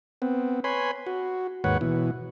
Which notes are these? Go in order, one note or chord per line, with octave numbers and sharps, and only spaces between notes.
B3 C4
B4 C#5 G#5 B5 C6
F#4
D#2 G#2 B4 C#5 F#5
B2 E3